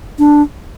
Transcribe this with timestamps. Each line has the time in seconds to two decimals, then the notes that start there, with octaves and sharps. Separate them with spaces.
0.19 D4